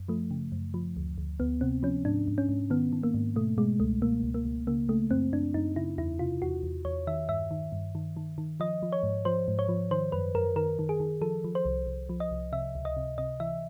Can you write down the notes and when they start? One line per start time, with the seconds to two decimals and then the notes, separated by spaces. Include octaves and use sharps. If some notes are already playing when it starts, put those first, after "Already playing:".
Already playing: F#2
0.08 F3 A3
0.31 C#3
0.52 F#2
0.74 F3
0.97 D2
1.18 D2
1.40 D2 B3
1.61 C3 C4
1.83 F3 C#4
2.05 G#2 D4
2.28 G#2
2.38 C#4
2.49 G#2
2.70 D#3 B3
2.93 D#3
3.03 A#3
3.14 G#2
3.36 B2 A3
3.58 B2 G#3
3.80 C#2 A3
4.02 B2 A#3
4.24 C#2
4.34 A#3
4.45 C#2
4.67 C#3 A#3
4.89 C#3 A3
5.11 F#2 C4
5.32 F#2 D4
5.54 F#2 D#4
5.76 C#3 E4
5.98 E2 E4
6.19 C3 F4
6.42 E2 F#4
6.63 E2
6.85 E2 C#5
7.07 D#3 E5
7.29 G2 E5
7.51 D#3
7.72 G2
7.95 D#3
8.17 D#3
8.38 D#3
8.60 F3 D#5
8.82 F3
8.92 C#5
9.03 G#2
9.25 F3 C5
9.48 G#2
9.59 C#5
9.69 F3
9.91 D#3 C5
10.12 F#2 B4
10.35 F#2 A#4
10.56 D#3 A#4
10.79 D#3
10.89 G#4
11.00 D#3
11.21 F3 A4
11.44 F3
11.55 C5
11.65 C2
11.87 C2
12.09 F3
12.20 D#5
12.31 C2
12.52 C3 E5
12.75 C#2
12.85 D#5
12.97 C3
13.18 C3 D#5
13.40 E3 E5